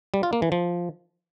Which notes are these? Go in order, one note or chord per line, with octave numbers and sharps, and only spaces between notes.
G3
F4
A#3
E3
F3